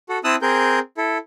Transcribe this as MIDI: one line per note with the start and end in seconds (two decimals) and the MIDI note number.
0.09 0.18 66
0.09 0.18 69
0.24 0.36 60
0.24 0.36 64
0.24 0.36 81
0.24 0.36 87
0.24 0.36 88
0.24 0.36 90
0.42 0.79 60
0.42 0.79 68
0.42 0.79 70
0.42 0.79 91
0.97 1.18 64
0.97 1.18 69